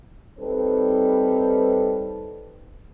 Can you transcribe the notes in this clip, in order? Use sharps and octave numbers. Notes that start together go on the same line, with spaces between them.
G3 C4 D#4 A4 B4